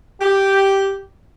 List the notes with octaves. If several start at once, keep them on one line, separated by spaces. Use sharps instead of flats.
G4